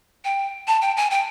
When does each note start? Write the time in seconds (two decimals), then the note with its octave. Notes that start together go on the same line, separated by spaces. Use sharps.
0.25 G5
0.67 A5
0.81 G5
0.97 G#5
1.11 G5